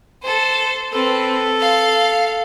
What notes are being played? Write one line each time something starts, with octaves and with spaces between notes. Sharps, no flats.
A4 C5
C4 A4 B4
F5